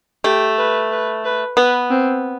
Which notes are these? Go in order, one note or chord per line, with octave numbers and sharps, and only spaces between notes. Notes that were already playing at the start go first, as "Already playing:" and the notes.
A3 G4
B4
B4
B4
B3 B4
C4